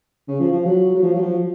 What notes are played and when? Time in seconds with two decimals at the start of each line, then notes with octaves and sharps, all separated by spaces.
0.28 C#3
0.40 F3
0.52 F3
0.65 F#3
0.95 F#3
1.03 F3
1.14 F#3
1.22 F3